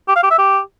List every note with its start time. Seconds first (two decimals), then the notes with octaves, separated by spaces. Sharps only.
0.08 G4
0.16 F5
0.23 G4
0.31 E5
0.38 G4